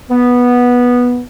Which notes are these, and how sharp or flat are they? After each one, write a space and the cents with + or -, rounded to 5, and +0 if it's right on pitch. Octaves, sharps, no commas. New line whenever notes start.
B3 -10